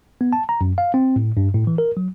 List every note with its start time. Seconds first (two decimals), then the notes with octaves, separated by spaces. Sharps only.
0.21 B3
0.33 A5
0.49 A#5
0.61 F#2
0.78 F5
0.94 C4
1.16 A2
1.37 G2
1.54 A2
1.67 E3
1.78 A#4
1.97 F#3